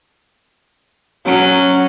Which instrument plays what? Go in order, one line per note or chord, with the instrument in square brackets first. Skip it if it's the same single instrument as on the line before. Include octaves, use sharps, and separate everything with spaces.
[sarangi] F#3 [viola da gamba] C#4